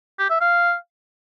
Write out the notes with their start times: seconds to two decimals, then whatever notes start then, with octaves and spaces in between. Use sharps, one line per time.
0.19 G4
0.30 E5
0.41 F5